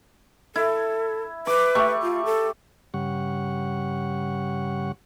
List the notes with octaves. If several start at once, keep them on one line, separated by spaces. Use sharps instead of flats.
E4 A4
B4 D6
A3 G4 C#6
F4
A4
G2 C#3 G3 F#5 C#6